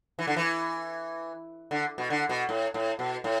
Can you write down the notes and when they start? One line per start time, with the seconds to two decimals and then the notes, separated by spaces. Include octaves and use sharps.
0.19 E3
0.27 D3
0.37 E3
1.71 D3
1.98 B2
2.10 D3
2.29 B2
2.49 A2
2.74 A2
2.99 B2
3.24 A2